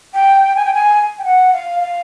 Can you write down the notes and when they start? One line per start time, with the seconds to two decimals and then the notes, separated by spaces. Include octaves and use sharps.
0.14 G5
0.56 G#5
0.65 G5
0.74 G#5
1.19 G5
1.24 F#5
1.53 F5
1.80 F5